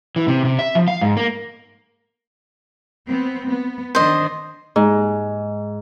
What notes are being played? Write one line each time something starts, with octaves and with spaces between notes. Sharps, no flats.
E3
C3
C3
E5
F3
F5
G#2
A#3
B3 C4
B3
D#3 D4 C5 D#5
G#2